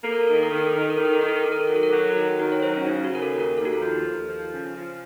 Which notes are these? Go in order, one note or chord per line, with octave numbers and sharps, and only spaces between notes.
A#3 A4
A#4
A4
D#3 A#4
A4
A#4
D#3 A4
A#4
A4
D#3 A#4
A4
A#4
D#3 A4
A#4
A4
D#3 A#4
A4
A#4
D#3 A4
A#4
A4
F#3 A#4
A4
A#4
F#3 A4
F#4
D#3 A4
D#3 F#4
C#5
F#3 C5
C#4
C#3 D#4
F#4
C#3 A#4
A4
D#2
A#4
D#2 A4
F#4
A4
F3
D#2
F3
C#3
F3